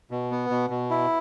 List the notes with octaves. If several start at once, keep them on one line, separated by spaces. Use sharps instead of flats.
B2
B3
B2
B2
E4